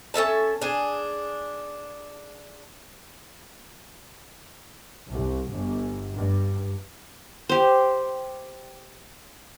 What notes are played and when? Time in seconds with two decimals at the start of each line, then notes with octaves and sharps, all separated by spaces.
0.14 C#4 A4 E5 A5
0.61 D4 G#4
5.11 C2
5.50 G1
6.14 G2
7.49 G4 C5